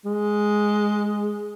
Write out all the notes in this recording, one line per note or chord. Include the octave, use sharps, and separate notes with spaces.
G#3